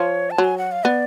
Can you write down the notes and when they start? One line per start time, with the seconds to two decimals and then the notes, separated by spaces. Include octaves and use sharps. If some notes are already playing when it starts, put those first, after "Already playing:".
Already playing: F3 C#5
0.31 A5
0.38 F#3
0.44 G#5
0.58 F#5
0.72 F5
0.85 B3 D5